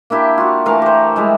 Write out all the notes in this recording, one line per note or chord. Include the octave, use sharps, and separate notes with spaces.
A#3 D4 E4 G4
F4 F#4
E3 A3 A#4 F5
G4 C5
G3 G#3 E4